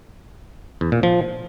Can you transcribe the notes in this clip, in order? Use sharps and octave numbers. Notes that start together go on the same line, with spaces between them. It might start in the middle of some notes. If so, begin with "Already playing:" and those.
E2
A#2
F3